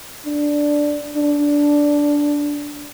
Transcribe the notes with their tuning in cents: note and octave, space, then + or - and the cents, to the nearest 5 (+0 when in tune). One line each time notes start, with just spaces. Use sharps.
D4 +0
D4 -10